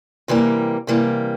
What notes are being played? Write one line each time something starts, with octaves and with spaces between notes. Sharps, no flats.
C3 E3 G3 A#3
C3 E3 G3 A#3